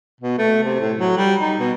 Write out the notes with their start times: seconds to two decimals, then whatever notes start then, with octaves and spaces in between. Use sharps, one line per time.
0.21 B2
0.38 A3
0.63 C3
0.80 A2
0.98 F#3
1.17 G3
1.41 D#4
1.59 B2